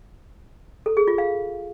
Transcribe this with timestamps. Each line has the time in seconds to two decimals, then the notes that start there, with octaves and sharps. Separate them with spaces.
0.86 A4
0.97 G#4
1.08 F4
1.18 F5